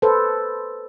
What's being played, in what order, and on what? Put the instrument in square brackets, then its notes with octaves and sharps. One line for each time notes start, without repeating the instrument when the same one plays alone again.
[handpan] A4 B4 C5